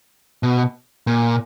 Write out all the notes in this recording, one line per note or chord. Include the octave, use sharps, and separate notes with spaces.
B2
A#2